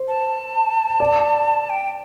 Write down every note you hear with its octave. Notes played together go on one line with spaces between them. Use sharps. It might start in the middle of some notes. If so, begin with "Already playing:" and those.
Already playing: C5
A5
D5
G5